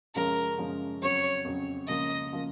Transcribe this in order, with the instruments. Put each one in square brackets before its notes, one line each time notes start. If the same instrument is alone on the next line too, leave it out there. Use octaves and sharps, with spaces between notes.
[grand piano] F#2 C#3 F3 G#3 C#4 [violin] A#4
[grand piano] F#2 C#3 F3 G#3 C#4
[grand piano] F2 C#3 F#3 [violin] C#5
[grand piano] F2 C#3 F#3
[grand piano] C#2 C#3 F3 A#3 F4 [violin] D#5
[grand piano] C#3 F3 A#3 F4